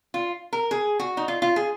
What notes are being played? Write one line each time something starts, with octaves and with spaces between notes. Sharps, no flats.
F4
A#4
G#4
F#4
D#4
F4
F4
G#4